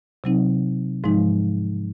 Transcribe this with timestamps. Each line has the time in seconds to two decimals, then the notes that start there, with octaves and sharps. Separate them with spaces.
0.24 C3 F#3 C4 D#4
1.04 G#2 F3 G#3 D#4